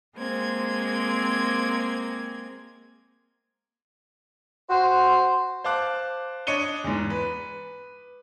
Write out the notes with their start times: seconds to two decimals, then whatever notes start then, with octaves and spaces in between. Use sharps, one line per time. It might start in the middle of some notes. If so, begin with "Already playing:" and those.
0.16 G#3 A#3 C4 G#6
4.70 F#4 C5
5.64 C5 F5 A5 D6 F#6
6.47 D4 C#5 D#5 C#7 D#7 G7
6.84 E2 G#2
7.10 B4